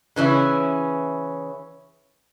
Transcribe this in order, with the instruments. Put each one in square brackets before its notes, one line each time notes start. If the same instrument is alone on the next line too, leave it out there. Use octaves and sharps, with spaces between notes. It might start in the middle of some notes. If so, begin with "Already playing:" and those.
[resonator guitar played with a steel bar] C#3 E3 C#4 E4